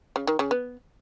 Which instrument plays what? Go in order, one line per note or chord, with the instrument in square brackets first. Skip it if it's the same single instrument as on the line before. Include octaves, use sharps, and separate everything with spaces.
[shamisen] C#3
D#3
C#3
B3